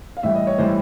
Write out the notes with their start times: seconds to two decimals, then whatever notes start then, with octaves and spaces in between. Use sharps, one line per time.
0.17 F5
0.23 A2 E3 G3 E5
0.35 D#5
0.47 C#5
0.58 A2 E3 G3 C5